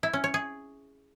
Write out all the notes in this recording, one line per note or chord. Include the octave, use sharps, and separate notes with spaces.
E4
C#4
C#5
G#4